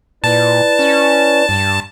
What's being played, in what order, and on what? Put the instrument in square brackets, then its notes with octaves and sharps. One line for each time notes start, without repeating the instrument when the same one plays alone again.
[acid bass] A#2 [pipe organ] E4 B4 D5 [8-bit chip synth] A5
[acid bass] C#4
G2